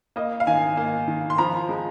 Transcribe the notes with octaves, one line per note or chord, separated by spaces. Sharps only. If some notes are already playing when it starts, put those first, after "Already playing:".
A#3 D#5
F5
D#3 G#5
A#3
D#3
C6
F3 A#5
G#3